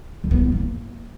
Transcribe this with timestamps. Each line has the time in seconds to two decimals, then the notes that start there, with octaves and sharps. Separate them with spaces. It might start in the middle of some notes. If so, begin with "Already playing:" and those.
0.24 D3
0.31 B3
0.38 A3
0.45 E4
0.52 A#3